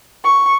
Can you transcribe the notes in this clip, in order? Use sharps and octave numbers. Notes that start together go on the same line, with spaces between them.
C#6